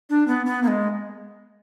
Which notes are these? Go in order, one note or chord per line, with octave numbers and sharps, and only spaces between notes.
D4
B3
B3
A#3
G#3